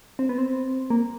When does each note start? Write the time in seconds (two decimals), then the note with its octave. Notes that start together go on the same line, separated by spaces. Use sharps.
0.19 C4
0.29 B3
0.38 C4
0.90 A#3